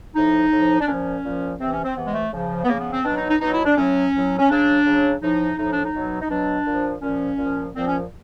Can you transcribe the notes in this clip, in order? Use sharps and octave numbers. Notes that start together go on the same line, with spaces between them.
A2 F3 D#4
A2 F3
D4
A#2 F3 C#4
A#2 F3
C3 E3 C4
C#4
C4
C3 E3 B3
G#3
A3
C#3 F3
B3
C#3 F3 A#3
B3
C4
B2 F#3 D4
D#4
D#4
B2 F#3 D#4
E4
D4
A2 F#3 C#4
A2 F#3
C#4
C#3 F#3 D4
C#3 F#3
A2 F3 D#4
A2 F3 D#4
D4
D#4
B2 F#3
D#4
B2 F#3 D4
A#2 F3
A#2 F3 C#4
A#2 F3
A#2 F3 C4
C#4